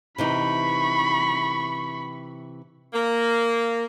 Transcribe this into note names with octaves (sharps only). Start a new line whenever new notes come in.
C3 E3 D#4 B5 C#6
A#3